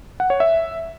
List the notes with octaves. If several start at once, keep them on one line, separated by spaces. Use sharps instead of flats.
F#5
C#5
E5